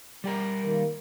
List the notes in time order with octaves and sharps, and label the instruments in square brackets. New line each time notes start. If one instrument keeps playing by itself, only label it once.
[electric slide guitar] G3 G4 A#4
[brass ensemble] D#3 A#3